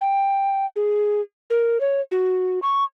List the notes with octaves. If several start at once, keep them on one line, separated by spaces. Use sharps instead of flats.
G5
G#4
A#4
C#5
F#4
C#6